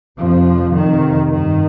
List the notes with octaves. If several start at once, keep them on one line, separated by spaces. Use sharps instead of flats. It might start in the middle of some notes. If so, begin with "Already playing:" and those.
F2 C3 F3
F2 C3 D#3
G2 D#3